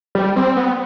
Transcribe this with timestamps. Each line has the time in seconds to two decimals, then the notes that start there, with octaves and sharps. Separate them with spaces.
0.15 G3
0.36 C4
0.56 B3